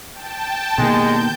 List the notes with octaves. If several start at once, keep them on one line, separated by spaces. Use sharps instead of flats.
G5 A5
B2 D#3 G#3 A#3 G6